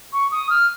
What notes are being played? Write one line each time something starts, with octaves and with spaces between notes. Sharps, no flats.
C#6
D#6
F6